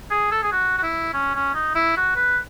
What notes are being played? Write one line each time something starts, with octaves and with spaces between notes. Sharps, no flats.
G#4
A4
G#4
F#4
F#4
E4
C#4
C#4
D#4
E4
F#4
B4